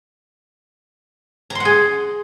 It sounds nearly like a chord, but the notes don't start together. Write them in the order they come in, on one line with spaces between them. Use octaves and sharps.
A#5 C6 F#5 G#4